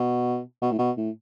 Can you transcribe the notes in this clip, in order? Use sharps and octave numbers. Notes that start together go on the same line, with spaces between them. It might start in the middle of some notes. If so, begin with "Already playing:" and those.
Already playing: B2
B2
A2
B2
A2